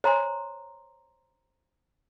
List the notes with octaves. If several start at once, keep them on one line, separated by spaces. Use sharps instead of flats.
C5 C#5 G#5 A#5 C6